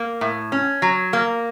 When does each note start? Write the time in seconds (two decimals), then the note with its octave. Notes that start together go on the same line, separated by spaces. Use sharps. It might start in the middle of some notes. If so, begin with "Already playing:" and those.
Already playing: A#3
0.21 A2
0.52 C#4
0.82 F#3
1.13 A#3